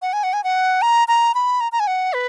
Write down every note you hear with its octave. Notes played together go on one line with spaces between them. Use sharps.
F#5
G#5
F#5
G#5
F#5
A#5
A#5
B5
A#5
A#5
G#5
F#5
B4